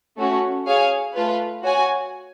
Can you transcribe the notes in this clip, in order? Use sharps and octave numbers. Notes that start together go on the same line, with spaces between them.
A3 C#4 F#4
G#4 C#5 F5 G#5
A3 F4 B4
F#4 C#5 G#5